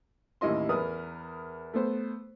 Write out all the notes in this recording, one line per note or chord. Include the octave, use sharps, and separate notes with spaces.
A1 D#2 E4 D#5 C6
E2 A#4 B4 D#6
A3 B3 C5